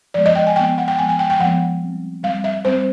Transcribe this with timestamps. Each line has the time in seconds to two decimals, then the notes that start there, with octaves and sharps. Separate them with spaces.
0.14 F3 G#3 B3 D5
0.26 D#5
0.35 G5
0.47 G#5
0.56 F3 G#3 B3 G5
0.67 G5
0.78 F#5
0.88 G5
0.99 F3 G#3 B3 G#5
1.09 G#5
1.19 G5
1.30 G5
1.39 F3 G#3 B3 F#5
1.82 G3 C4
2.23 G3 C4 F5
2.44 E5
2.65 G3 C4 C5